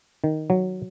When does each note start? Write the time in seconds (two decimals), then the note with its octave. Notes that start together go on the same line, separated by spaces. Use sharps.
0.24 D#3
0.50 F#3